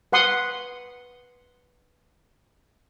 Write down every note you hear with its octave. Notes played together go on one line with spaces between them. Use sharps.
B4 F#5 C6 D#6